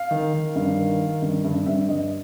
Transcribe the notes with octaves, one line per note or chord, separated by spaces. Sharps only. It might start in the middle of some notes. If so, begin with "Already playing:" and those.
Already playing: F5
D#3
D#3
G2
D#3
D#3
G2
G2
G2 E5
G2 D#5